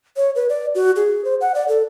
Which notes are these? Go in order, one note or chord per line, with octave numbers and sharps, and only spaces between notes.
C#5
B4
D5
F#4
G#4
C5
F#5
D5
A4